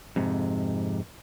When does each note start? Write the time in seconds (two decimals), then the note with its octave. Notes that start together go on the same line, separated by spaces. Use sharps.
0.16 F2 G#2 C3